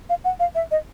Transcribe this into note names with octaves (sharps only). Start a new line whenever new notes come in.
F5
F#5
F5
E5
D#5